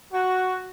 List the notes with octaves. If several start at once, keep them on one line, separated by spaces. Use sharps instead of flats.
F#4